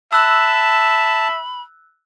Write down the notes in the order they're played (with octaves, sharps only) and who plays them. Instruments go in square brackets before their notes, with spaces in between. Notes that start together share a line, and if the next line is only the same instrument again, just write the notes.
[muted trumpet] E5 [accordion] A5 [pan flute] B5 [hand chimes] E6 F#6